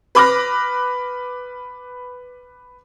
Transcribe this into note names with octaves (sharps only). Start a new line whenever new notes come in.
B4 B5 D6 F6 F#6 A#6